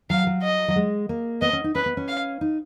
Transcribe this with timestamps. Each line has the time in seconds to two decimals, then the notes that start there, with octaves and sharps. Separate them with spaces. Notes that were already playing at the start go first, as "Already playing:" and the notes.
0.10 F#3 F5
0.27 F#3
0.43 D#5
0.68 F#3
0.76 G#3
1.09 A#3
1.41 B3 D#5
1.53 C#4
1.64 D#4
1.75 C#4 B4
1.86 B3
1.97 C#4
2.08 F5
2.41 D#4